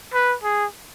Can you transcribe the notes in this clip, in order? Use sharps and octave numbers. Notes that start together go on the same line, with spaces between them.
B4
G#4